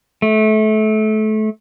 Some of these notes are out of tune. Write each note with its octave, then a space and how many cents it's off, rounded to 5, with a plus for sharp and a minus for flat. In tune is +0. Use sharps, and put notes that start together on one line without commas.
A3 -25